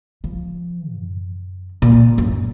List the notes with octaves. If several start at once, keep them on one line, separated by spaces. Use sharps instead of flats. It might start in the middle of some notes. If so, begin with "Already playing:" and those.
F3
F#2
A#2
F#2